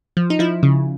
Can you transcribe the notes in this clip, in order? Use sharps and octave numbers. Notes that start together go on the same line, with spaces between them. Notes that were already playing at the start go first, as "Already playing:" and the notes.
F3
D#4
F3 E4
C#3